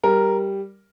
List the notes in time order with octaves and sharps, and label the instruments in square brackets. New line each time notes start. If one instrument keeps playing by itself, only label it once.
[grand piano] G3 A#4